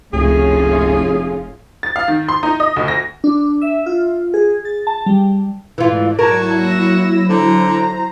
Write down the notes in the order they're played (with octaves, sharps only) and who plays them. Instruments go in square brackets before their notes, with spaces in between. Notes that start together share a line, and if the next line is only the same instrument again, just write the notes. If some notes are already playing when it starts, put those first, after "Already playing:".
[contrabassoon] F1 [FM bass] C#2 [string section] A2 C#4 F4 [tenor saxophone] G#4
[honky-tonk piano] A6
F5
D#3
C6
D#4
D#5
D2
A#6
[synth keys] D4
E5
F4
G#4
A6
A5
G3
[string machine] G#2 A3 D5 [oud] E3 F4
[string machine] F#3 E4 [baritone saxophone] F#4 [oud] A#4 [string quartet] A5 C#6 G#6
[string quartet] A#3 E6 A#6
[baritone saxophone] D3 [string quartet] C5 A#5